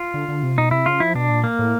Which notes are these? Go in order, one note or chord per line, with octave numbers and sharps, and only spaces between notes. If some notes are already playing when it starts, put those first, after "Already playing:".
Already playing: F4
D3
D3
C3
B2 D#4
C3 E4
C#3 F4
F3 E4
B2 D4
A#2
A#3
A2